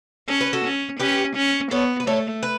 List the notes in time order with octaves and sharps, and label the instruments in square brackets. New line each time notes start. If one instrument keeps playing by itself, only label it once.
[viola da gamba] C#4 [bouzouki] A4
[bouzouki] B4
F#4 A4
[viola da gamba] C#4
[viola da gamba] C#4 [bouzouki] G4 B4
[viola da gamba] C#4
[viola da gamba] B3 [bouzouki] A4 C#5
[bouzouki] B4
[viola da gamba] A3 [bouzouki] A4 C#5
[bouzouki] B4